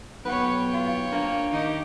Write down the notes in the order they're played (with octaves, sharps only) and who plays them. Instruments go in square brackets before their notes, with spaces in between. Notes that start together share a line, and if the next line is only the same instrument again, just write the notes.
[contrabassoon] B1 [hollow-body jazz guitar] B3 F#5 [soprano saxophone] B4 [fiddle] C#5 G5
[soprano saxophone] F4
[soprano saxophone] A#3 [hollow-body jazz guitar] D4 A#4 F5
[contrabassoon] D#3 [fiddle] D#4 G4